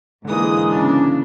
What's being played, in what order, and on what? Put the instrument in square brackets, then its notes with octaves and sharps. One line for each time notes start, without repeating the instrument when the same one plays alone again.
[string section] G#2 A#3 D#6 [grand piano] D3 E3 [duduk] G#3
[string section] C#3 A#3 D4